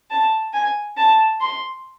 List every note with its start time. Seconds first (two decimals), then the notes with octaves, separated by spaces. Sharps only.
0.11 A5
0.54 G#5
0.97 A5
1.40 C6